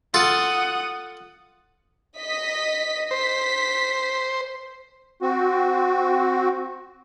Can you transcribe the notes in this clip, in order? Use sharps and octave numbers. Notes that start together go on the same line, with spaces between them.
F4 A4 F#5 C6 D#6
D#5 B6
C5 B6
C4 F#4